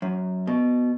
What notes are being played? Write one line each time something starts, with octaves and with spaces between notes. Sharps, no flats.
F#2
B2